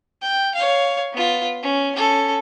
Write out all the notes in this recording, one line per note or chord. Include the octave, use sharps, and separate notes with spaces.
G5
C#5 F5
B3 F4
C#4
C#4 A4